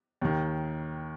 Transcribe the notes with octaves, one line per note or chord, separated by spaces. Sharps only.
D#2 D#3